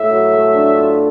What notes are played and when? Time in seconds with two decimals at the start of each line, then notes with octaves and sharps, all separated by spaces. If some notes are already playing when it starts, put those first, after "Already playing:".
Already playing: A2 E5
0.10 F#3
0.32 A3
0.54 D4
0.76 F4